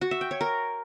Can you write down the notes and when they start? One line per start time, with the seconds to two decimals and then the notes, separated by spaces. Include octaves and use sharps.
0.01 F#4
0.11 E5
0.21 G5
0.31 C#5
0.41 A#4